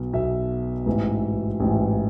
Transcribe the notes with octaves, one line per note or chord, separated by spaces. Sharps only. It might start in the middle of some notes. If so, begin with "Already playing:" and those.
Already playing: B1 B2
B1 B2 E5
A1 G#2 E3
A1 G#2 E3